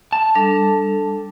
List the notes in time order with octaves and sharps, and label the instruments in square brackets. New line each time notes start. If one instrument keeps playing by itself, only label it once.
[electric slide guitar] A5
[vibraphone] G3 D4 A4